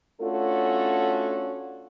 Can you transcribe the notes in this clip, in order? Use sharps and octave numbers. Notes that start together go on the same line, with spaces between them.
A3 C#4 D4 F4 F#4 A4